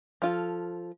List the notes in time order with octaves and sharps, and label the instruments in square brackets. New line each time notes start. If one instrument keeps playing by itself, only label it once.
[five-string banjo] F3 F4 A4